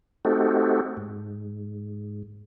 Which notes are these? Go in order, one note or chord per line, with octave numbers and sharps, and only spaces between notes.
A3 C4 D#4 F#4 G4 A4
G#2